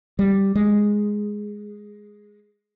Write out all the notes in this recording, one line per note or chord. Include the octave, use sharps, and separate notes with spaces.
G3
G#3